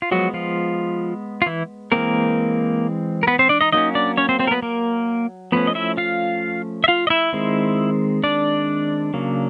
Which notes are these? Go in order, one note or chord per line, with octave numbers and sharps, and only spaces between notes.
F4
F3 F#3 G#3 B3 F#4
F3 F4
F4
E3 E4
E3 G#3 A#3 C4 A#4
A#4
B3 B4
C4 C5
D4 D5
D#4 D#5
F#3 A#3 C#4 D#4 D#5
D4 D5
C#4 C#5
C4 C5
C4 C5
A#4
B3 B4
A#3 A#4
F3 A3 B3 C#4 B4
D#5
E4 E5
F4 F5
E5
F4 F5
D#5
E4 E5
D#3 G#3 C4
D4 D5
C#3 F#3 A#3